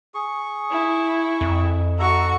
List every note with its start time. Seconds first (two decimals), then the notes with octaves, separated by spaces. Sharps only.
0.14 G#4 C#6
0.71 E4
1.41 F2
1.99 F#4 A4 E5 A#5 C#6